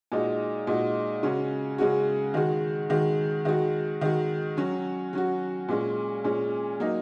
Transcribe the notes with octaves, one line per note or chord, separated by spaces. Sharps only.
A#2 G#3 D#4 F#4
A#2 G#3 D#4 F#4
C#3 G#3 C#4 F#4
C#3 G#3 C#4 F#4
D#3 G#3 F#4
D#3 G#3 F#4
D#3 G#3 F#4
D#3 G#3 F#4
F#3 C#4 F#4
F#3 C#4 F#4
A#2 G#3 C#4
A#2 G#3 C#4
F#3 A#3 D#4